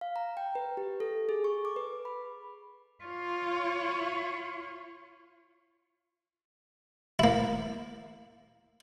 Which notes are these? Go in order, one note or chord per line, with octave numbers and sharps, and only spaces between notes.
F5
A#5
G5
B4
G4
A4
G#4
C#6
D6
B4
B5
F4 C#5
A#3 E4